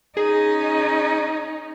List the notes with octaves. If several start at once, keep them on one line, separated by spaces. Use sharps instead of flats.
C#4 D#4 G#4